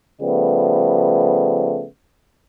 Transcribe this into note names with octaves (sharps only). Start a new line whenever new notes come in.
C#3 F3 G3 A3 B3